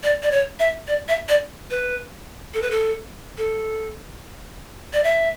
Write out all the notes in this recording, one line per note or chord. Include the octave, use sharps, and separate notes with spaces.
D5
D5
C#5
E5
D5
E5
D5
B4
A4
B4
A4
A4
D5
E5